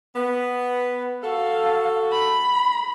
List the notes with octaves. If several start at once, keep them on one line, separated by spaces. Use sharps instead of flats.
B3
F#4 A4 F5
B5